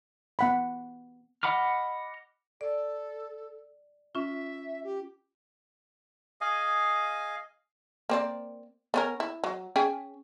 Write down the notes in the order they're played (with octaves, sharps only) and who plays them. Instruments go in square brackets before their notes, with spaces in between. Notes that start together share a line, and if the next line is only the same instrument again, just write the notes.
[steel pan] B3 F#5 B5
[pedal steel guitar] D#5 F#5 B5 D6 F6
[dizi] A4 [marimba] D5
[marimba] C#4 F4 [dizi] E5
[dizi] G4
[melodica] G#4 D#5 F5 G#5
[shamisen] A#3 C4 D5
B3 C#4 A#4
E4
F#3
C#4 G#4 G5